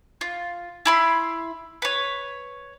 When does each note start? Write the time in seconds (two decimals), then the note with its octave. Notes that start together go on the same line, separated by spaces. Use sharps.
0.21 F4
0.85 E4 B5 C6
1.82 B4 C#5